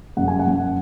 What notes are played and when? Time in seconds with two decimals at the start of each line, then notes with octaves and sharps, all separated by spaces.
0.17 F#2 F#5
0.28 G#5
0.39 F#5
0.47 F#2